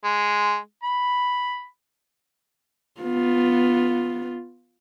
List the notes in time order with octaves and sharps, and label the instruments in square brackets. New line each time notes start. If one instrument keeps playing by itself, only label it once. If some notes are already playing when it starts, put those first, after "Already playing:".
[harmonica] G#3
B5
[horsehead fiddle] B3 F4